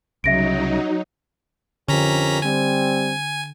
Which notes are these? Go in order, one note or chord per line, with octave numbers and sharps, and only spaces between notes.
C2 C#3 F#3 D#4 E5 A#6 D7
F2 D3 C#4 G4 A#4 A#5 B6
G3 C4 G#5